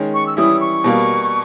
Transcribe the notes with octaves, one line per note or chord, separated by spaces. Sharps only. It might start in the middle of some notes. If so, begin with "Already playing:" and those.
Already playing: D#3 G#3 C#4
C#6
E6
E3 G3 C#4 E4 D#6
C#6
B2 G3 A#3